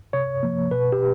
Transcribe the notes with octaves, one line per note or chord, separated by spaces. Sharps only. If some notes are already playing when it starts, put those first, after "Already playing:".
C3 C#5
F3 A#3
B2 B4
G4